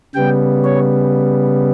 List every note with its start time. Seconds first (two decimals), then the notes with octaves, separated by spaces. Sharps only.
0.15 C#3 G3 B3 G5
0.64 C#5